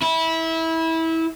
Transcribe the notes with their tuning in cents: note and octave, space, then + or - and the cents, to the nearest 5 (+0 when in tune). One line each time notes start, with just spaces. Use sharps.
E4 -20